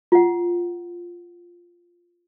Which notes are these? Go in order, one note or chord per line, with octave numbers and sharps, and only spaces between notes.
F4 F#5